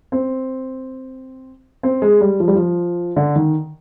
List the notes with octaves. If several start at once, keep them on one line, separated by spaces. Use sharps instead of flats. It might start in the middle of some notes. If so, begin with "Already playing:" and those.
C4
C4
G#3
G3
F3
G3
F3
D3
D#3